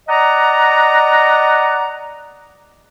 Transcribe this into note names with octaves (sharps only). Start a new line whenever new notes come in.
D5 D#5 F#5 A#5